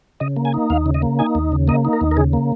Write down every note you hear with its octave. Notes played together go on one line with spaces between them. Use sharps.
C#3 D#5
A#3
G#5
D#4
D#2 F5
C#3
D#5
A#3
D#4 G#5
D#2
C#3
A#3 D#5
D#4
A#4
D#2
A#4
C#3 G#4
A#3